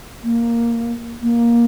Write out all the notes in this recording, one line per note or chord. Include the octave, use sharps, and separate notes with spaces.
A#3
A#3